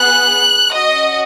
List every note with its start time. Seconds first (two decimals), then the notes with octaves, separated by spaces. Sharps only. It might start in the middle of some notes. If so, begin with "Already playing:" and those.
Already playing: B3 G#4 F#6
0.75 C#4 F#4 D#5